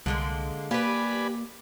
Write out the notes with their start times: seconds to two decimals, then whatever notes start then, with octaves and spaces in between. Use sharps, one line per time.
0.06 C2 D3 G#3 A#3
0.71 A#3 G4 B4 D5 G#5 B5